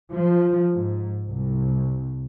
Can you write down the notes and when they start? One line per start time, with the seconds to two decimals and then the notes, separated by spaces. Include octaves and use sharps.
0.10 F3
0.71 G#2
1.28 C2